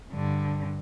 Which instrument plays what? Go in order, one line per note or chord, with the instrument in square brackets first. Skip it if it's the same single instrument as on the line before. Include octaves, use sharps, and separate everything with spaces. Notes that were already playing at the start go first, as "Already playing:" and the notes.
[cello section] G2 [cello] D3